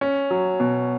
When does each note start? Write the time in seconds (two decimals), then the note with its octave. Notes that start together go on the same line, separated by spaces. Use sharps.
0.01 C#4
0.30 F#3
0.60 B2